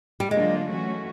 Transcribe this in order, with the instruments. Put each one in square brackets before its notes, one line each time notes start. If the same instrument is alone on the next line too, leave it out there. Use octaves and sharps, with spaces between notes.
[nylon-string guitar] G3
[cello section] D3 F#3 A#3 D4 F4 [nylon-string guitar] G#3
[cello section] E3 A3 C#4 F#4